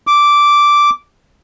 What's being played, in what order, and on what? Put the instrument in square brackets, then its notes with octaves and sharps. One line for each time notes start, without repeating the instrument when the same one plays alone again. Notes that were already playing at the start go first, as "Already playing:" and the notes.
[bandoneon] D6